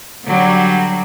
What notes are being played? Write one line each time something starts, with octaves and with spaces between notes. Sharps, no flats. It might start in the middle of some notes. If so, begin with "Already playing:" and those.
D3 F#3 G3